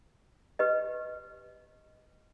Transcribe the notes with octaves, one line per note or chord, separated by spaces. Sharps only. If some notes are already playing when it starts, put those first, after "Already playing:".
G4 B4 D#5